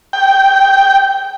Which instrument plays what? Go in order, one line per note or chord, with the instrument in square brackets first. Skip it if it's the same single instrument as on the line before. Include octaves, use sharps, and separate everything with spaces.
[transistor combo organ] G5